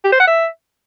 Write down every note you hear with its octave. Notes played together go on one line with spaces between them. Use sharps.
G4
C5
F#5
E5